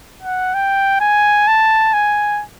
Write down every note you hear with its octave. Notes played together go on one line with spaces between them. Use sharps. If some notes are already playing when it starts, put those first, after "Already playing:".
F#5
G5
G#5
A5
G#5